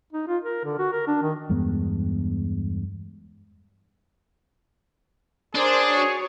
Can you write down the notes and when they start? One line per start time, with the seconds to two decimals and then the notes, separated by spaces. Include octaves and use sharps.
0.13 D#4
0.28 F4
0.43 A#4
0.64 D3
0.79 F#4
0.92 A#4
1.07 D4
1.22 D#3
1.49 E2 G2 G#3 B3
5.55 D4 G#4 A#4 C5 D5
5.89 F#4 C#5